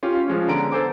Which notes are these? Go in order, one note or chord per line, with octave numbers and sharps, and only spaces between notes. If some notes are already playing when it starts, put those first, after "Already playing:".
C#4 F4 G4
F3 G#3 C#4
D3 B3 A#5 D7
A4 C5 G#5 D6